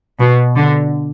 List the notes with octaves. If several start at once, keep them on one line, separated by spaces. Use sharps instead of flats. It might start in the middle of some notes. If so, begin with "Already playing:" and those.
B2
D3